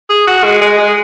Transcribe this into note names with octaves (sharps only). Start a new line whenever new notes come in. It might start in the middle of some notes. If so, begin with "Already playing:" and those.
G#4
F#4
G#3
G#3
G#3